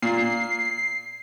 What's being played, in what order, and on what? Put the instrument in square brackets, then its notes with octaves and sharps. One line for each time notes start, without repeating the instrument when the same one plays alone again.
[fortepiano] A#2 [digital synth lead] C7